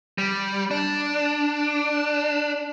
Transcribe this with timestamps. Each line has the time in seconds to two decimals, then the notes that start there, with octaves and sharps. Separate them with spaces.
0.18 G3
0.71 D4